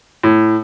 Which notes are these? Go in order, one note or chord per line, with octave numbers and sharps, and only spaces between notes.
A2